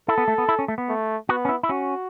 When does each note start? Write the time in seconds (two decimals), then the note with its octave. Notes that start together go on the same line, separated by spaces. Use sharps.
0.08 E4 A4
0.18 B3
0.28 A3
0.38 B3
0.49 E4
0.59 C#4
0.68 A3
0.78 B3
0.89 A3
1.29 B3 F#4
1.45 C#4
1.49 E4
1.63 E4
1.69 C#4 F#4